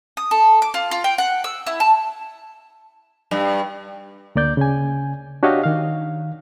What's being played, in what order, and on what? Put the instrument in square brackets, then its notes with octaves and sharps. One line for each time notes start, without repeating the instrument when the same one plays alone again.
[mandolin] D#6
A4
D6
F4
F4
G5
F#5
E6
E4
A5
[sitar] G2
[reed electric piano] D2 A#3 D5 G6
C#3 G#5
D4 F#4 G4 C#5 D#5 F5
D#3 F5